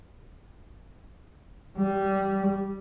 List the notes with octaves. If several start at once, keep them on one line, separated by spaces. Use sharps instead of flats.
G3